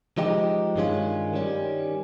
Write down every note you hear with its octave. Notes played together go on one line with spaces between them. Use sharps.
F3 G#3 D#4 G4
G2 D#3 G#3 C#4 F4
D#3 G3 C#4